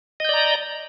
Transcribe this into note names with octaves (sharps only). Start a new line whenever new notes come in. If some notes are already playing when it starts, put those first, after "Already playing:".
D5 D#5 A#5 G6